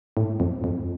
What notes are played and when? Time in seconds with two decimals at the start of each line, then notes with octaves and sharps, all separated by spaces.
0.17 A2
0.40 F2
0.64 F2